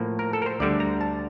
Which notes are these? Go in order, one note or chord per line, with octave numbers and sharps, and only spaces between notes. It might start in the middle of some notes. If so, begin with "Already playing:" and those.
Already playing: A2 F3 A#3
A#4
A4
A#4
C5
D2 D3 G3 D5
A#5
A5